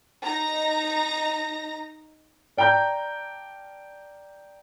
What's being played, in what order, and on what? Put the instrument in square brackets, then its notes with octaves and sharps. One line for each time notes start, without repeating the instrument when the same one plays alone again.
[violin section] D#4 A#5 A#6
[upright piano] D5 G5 A5 A#5 G6